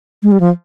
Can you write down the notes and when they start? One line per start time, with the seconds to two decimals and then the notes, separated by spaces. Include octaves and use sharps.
0.23 G#3
0.32 G3
0.40 F3